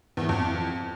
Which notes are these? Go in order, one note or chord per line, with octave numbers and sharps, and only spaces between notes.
E2
E3
F2